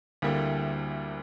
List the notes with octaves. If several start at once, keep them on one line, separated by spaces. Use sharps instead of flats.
D2 D3 G3 A#3 E4